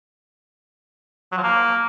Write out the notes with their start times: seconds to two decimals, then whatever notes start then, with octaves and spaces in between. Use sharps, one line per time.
1.32 F#3
1.37 F3
1.43 A#3